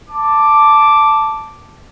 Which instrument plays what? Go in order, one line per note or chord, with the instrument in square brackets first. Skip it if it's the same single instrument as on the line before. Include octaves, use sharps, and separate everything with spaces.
[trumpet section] A5 D6